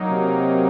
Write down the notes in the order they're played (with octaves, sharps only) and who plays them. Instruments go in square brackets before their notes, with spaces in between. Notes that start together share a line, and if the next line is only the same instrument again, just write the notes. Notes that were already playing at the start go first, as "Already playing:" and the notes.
Already playing: [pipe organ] F#3 A#3 D#4
[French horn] C3